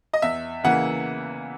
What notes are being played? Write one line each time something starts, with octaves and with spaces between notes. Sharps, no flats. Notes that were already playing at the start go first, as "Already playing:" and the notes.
D#5
E2 E5
C#3 E3 A#3 F#5